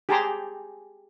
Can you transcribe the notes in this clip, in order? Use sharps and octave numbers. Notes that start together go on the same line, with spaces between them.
G4 G#4 G5 A5 A#5 C6